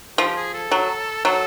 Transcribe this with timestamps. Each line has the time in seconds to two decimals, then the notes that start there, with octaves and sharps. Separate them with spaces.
0.18 F3 G4
0.36 G#4
0.54 A4
0.71 F#3
1.25 F#3 A4